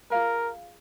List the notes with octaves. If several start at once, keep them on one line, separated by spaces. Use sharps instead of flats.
F4 G#4 A#4 F5 G#5